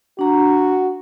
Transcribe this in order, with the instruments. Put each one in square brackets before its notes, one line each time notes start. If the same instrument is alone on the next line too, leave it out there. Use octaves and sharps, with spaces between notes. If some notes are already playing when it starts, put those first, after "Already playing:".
[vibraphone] D4 A#5 [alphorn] F#4